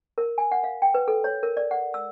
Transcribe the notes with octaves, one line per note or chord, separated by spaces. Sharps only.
A#4
G#5
F#5
F5
G5
B4
A4
C#5
A#4
D5
F#5
E6